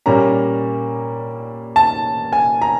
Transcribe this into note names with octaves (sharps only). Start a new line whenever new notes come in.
A#2 G3 A#3 C#4 A#5
A5
G#5
A#5